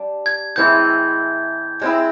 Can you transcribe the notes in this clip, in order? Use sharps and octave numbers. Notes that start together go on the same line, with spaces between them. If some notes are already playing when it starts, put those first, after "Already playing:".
Already playing: G3 D4
G#6
A2 E3 G#3 C4 E4 G6
G#3 C4 E4